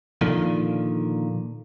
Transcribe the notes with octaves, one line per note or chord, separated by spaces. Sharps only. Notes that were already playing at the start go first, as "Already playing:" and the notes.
A#2 D3 D#3 F3